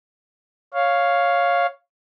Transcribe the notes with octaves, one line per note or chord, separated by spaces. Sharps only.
C#5 F5